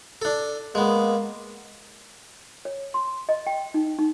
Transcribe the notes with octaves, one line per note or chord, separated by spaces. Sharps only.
D4 A4
G#3 A#3 B3
C#5
C6
D#5
G5
D#4
D#4